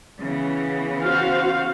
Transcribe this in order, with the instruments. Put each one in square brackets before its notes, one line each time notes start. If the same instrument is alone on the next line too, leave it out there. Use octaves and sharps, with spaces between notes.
[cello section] C#3 E3 B3
[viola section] F#4 C5 F5